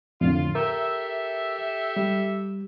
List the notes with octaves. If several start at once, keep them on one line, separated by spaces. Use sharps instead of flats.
F2 A2 D3 F4
G4 A4 A#4 E5
G3